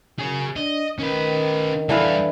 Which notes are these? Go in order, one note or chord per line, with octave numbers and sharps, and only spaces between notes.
F#2 G#4 C#5
D4 D#5
D#3 C#4 B4
D3 E3 G3 B4 F5